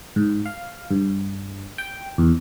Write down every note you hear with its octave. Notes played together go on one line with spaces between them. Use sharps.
G#2
F5
G2
G5
E2